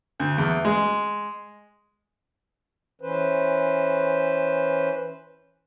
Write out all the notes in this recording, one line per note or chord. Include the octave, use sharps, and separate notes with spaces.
D2
E2
G#3
E3 C#4 B4 C5